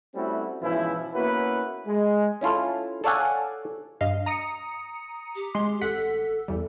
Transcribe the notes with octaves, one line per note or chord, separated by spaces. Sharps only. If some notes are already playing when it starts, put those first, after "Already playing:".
G3 A3 C4 C#4 E4 F#4
G#2 B2 E3 F3 C#4 E4
A#3 B3 C#4 E4 F#4 B4
G#3
C#4 E4 F4 A4
A4 C#5 D5 F5 F#5 G#5
G2 D#5 F5
A#5 D#6 C#7
G4
G#3 C6
A1 A4 F#5 B6
E2 G3